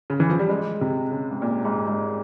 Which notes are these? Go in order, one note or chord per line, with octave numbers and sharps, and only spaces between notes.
C#3
E3
F3
G3
G#3
C3
C#3
G#2
A#2
G#2
G#2